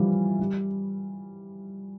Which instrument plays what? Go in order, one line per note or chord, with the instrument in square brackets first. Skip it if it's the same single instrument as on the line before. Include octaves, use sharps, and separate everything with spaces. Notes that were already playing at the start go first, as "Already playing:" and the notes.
Already playing: [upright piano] E3 F3 G3
G3